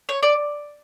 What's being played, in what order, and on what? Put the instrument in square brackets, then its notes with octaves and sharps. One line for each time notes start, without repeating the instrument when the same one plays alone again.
[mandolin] C#5
D5